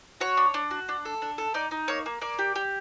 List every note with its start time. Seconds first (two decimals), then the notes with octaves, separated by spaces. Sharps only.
0.20 F#4 C#5
0.37 D4
0.54 D4
0.71 F#4
0.89 D4
1.05 A4
1.22 D4
1.38 A4
1.54 D#4 D5
1.71 D#4
1.88 A#3 C#5
2.06 A#3
2.21 A#3 D5
2.39 G4
2.56 G4